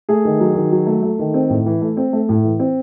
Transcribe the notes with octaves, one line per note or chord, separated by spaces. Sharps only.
A3 G#4
D#3
F#3
D#3
F#3
A3
A3
D#3
C4
A2
E3
A3
C4
A3
A2
E3
C4